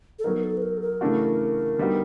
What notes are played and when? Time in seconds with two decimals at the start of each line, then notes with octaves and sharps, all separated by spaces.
0.19 A4
0.24 F#3 B3 D#4 A#4
0.43 A4
0.57 B4
0.62 A#4
0.77 A4
0.82 A#4
1.01 C#3 E3 A3 D4 F#4
1.78 D3 G3 B3 D#4 F#4